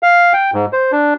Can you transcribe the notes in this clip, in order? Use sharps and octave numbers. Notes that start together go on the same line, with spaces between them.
F5
G5
G#2
C5
D4